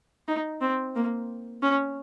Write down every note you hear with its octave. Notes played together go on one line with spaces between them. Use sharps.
D#4
C4
A#3
C#4